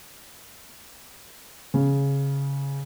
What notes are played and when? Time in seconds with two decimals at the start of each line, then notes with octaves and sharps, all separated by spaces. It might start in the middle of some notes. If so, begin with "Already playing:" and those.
1.74 C#3